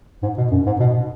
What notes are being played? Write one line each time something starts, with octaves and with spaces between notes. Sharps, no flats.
G#2
B2
F#2
G#2
B2